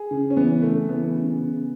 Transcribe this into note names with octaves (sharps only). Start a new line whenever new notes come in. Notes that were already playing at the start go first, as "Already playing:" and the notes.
Already playing: G#4
C#3
C#4
E3 B3
C#3 A3
E3 B3
C#3
C#3